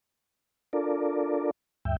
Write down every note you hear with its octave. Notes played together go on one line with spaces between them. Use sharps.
D4 F4 A4 A#4 D5
D2 G2 E5 G5